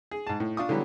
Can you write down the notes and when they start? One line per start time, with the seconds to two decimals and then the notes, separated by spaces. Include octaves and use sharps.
0.11 G#4
0.27 G#2 A5
0.40 A2
0.57 D4 F4 C#6 D#6
0.69 D3 E3 F#3 G3 B3